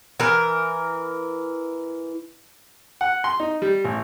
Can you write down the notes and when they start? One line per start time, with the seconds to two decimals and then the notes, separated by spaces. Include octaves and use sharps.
0.20 E3 A#4
3.01 F#5
3.24 C6
3.40 D#4
3.62 G3
3.85 A1